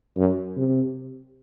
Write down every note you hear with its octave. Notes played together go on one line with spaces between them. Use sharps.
F#2
C3